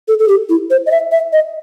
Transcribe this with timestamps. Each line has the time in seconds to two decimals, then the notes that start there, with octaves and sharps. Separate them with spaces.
0.08 A4
0.19 A4
0.28 G4
0.49 E4
0.70 C5
0.86 D#5
0.91 E5
1.12 E5
1.33 D#5